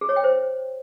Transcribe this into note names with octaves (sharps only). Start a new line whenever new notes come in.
G#4
C#5
G5
C5